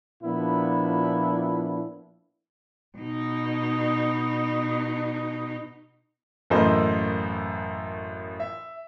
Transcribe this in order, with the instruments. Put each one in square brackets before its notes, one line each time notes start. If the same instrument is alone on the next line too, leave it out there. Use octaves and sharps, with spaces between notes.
[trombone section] A#2 F3 B3 D4 E4
[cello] B2 D#4
[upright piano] A1 F#2 A3 A#3 C5 D#5
E5